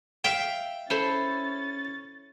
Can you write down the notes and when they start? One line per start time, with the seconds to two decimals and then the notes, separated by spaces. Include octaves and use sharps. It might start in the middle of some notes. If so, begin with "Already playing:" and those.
0.24 E5 F5 G5
0.90 C#4 E4 A4 C5 A6